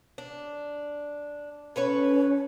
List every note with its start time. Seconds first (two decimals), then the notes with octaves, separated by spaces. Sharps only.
0.18 D4
1.76 C#4 A4 B4 C#5